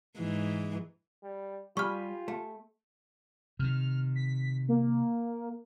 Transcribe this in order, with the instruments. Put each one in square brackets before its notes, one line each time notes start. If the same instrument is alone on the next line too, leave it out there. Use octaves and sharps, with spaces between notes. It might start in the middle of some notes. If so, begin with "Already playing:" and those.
[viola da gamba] G#2 E3
[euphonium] G3
[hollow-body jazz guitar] G3 [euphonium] F4 [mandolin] G4 G#5 B5 [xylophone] C#6 F6
[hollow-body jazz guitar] A3
[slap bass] C3 D#3 [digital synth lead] F6
[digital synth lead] B6
A#3